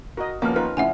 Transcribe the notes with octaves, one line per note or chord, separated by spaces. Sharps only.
F#4 A#4 D#5
D#2 F3 A#3 B3 C#4 F6
D#4 F4 A#4 B4
F2 A2 C#3 E5 F#5 G#5